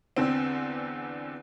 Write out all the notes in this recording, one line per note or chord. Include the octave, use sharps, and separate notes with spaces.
E2 D3 C4